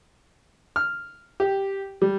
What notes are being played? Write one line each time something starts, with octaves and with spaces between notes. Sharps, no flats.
F6
G4
G3